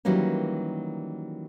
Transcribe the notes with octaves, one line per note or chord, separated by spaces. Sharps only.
D#3 E3 F#3 G3 A#3 C#4